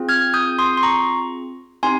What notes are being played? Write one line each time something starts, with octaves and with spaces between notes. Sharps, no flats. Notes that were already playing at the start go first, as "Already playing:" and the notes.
Already playing: C4 F4 G#4
F6 G#6
D#6 G6
C6 D#6
C6
A#5 C#6
C4 D#4 G4 G#5 C6